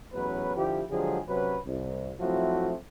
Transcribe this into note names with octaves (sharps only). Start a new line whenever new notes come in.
A1 E2 F#3 C#4 B4
D3 F3 E4 G4
D3 F3 F#3 G#3 G4 G#4
C3 F#3 C#4 B4
C2
F3 F#3 A3 C4 E4 F#4